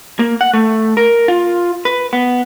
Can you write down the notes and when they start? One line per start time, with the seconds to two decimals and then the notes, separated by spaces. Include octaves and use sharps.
0.19 A#3
0.41 F#5
0.54 A3
0.97 A#4
1.28 F4
1.85 B4
2.13 B3